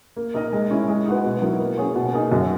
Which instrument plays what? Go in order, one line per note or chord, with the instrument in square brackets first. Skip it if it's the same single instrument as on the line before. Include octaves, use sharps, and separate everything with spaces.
[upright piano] A#3
D#4 A#4 D#5
G#3
C#4 E4
G#3
D#4 F#4 B4
B2
F#3 B3 E4 A#4
A#3
C#4 G#4 C#5
B2
A#3 D#4 G#4
F#2